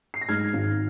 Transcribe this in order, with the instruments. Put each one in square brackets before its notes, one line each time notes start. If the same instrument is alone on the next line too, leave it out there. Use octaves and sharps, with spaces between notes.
[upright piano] C7
A#6
G#2 F6 G#6
G#1